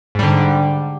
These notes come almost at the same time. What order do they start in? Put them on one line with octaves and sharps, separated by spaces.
G#2 G3 D3